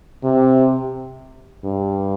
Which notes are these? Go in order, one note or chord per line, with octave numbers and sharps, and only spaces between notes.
C3
G2